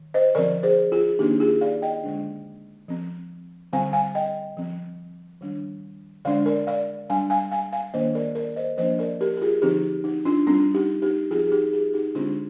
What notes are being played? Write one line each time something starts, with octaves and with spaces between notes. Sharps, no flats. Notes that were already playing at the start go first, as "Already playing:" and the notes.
Already playing: D#3
C5 D#5
D3 F3 C4 A#4 D5
G#4 C5
F4 G#4
D#3 A#3 D4 D#4 G4
F4 G#4
D5 F5
D#5 G5
D3 G#3 D4
F3 C4
D3 G3 C4 F5 G#5
F5 G#5
D#5 G5
F3 C4
D#3 G3 D4
D3 G#3 D4 D5 F5
A#4 D5
D5 F5
G3 D4 F5 G#5
F5 G#5
F5 G#5
F5 G#5
D#3 A#3 D4 C5 D#5
A#4 D5
A#4 D5
C5 D#5
F3 A#3 D4 C5 D#5
A#4 D5
G4 A#4
G4
F4 G#4
D3 F3 C4 D#4 G4
D#4
D4 F4
G3 C4 D4 F4
D#4 G4
D#4 G4
F3 C4 F4 G#4
G#4
D#4 G4
F4 G#4
D#4 G4
D3 G#3 C4 D4 F4